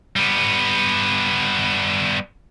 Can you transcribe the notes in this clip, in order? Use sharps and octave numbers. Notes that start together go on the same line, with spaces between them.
G3 B3